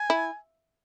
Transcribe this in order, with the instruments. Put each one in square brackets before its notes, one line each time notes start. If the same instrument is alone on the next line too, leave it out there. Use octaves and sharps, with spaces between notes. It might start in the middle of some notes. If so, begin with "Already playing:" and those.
Already playing: [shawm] G#5
[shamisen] E4